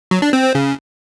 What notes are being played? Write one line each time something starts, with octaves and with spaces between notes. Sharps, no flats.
F#3
D4
C4
C4
C#3